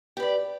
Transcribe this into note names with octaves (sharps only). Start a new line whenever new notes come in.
G4 B4 D5